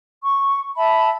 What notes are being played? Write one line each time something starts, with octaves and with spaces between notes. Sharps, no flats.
C#6
E5 A5 B5